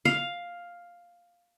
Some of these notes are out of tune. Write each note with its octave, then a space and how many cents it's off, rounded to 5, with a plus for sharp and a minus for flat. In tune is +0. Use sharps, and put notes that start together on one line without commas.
F5 +5